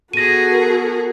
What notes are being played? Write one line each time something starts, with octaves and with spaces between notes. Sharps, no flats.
B3 F#4 G#4 A4 A#6 D#7
A#4